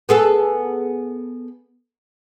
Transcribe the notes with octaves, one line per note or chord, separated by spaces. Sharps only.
B3 G#4 A4